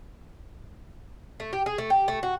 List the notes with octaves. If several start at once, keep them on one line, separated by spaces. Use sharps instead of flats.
A3
G4
G#4
A3
G4
A3
F#4